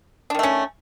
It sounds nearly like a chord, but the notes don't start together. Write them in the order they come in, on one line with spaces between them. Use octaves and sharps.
D4 D#3 A3 C#4